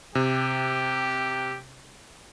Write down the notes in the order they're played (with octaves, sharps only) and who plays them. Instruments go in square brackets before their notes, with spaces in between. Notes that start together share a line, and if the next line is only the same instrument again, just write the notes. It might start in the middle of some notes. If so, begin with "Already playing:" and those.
[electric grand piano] C3 [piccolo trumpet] G4